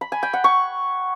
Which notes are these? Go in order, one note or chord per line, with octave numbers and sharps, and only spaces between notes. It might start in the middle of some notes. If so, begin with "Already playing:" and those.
B5
G#5
G5
F#5
C#6